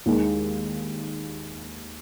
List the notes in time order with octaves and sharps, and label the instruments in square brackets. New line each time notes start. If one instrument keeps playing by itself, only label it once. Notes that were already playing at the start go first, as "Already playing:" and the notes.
[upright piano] D#2 D#3 G#3